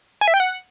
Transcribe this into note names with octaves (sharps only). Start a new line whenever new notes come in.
G#5
E5
G5
F#5